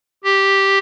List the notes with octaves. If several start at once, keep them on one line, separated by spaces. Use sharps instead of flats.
G4